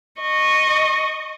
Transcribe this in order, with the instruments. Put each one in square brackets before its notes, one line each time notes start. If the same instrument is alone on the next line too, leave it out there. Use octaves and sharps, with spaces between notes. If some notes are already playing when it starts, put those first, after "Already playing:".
[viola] D#5 C#6